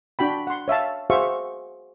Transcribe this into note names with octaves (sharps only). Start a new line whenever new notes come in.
D4 F#4 G5 B5
F#5 C6
C#5 E5 F5 A5
F#4 G#4 C5 E5 F5 C#6